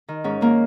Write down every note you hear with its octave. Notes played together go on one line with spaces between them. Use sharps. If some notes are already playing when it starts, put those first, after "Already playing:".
D#3
G#2 C#4
D#3 A#3